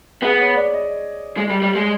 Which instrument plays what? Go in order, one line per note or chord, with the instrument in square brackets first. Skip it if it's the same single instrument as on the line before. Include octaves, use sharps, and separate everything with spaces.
[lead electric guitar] B3 [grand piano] G#4
[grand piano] C#5
D5
D#5
[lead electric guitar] G#3
G3
G3
G#3